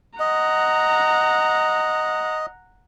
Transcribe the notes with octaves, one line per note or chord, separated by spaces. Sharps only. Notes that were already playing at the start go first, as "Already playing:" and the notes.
D#5 F#5 A#5